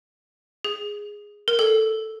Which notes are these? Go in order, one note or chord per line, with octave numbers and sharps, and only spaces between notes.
G#4
A#4
A4